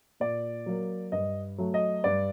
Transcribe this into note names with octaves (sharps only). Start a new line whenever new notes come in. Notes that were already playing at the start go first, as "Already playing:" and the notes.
A#2 D5
F#3 A#3
G2 D#5
F#3 A3
D#5
G2 D5